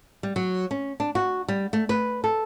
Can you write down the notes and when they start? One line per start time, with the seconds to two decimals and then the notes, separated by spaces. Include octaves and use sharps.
0.23 G3
0.36 F#3
0.71 C#4
1.00 D4
1.15 F#4
1.48 G3
1.73 A3
1.89 B4
2.24 A4